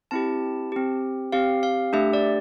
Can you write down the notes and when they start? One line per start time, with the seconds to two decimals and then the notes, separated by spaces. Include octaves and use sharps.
0.11 C4 E4 G4 A5
0.72 C4 G4
1.32 C4 G4 F5
1.63 F5
1.93 A3 D4 G4 E5
2.13 D5